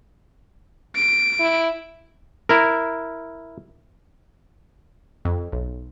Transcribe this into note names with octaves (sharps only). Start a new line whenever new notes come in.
D7
E4
E4 A#4
F2
B1